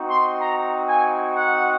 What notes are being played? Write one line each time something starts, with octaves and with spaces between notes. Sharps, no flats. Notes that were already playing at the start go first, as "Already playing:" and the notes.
Already playing: C4 D#4 F#4
C6
A#5
G#5
F#5